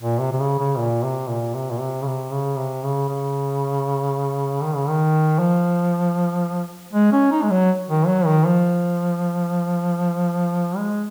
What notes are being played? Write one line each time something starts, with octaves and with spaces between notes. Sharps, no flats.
A#2
C3
C3
C#3
C#3
A#2
C3
A#2
C3
A#2
C3
C#3
C3
C#3
C3
C#3
C#3
D#3
C#3
D#3
F3
G#3
C#4
D#4
G#3
F#3
D#3
F#3
D#3
F3
G#3